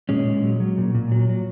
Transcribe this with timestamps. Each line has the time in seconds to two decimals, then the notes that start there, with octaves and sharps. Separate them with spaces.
0.09 A#2 G#3 C#4
0.26 A#2
0.43 F#3
0.60 F#3
0.78 A#2
0.95 A#2
1.11 F#3
1.29 F#3